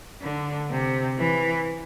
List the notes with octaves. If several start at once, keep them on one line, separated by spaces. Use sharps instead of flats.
D3
C3
E3